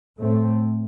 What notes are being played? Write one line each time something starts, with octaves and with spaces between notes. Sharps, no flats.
A2 A3 C4